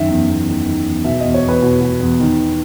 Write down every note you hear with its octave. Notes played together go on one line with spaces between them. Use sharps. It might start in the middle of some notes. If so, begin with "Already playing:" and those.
Already playing: F#2 D#3 E5
E2
E2
D#3
D#3
E2
B2 E5
E2 D#5
C#5
E2
B4
B2
B2
E2
D#3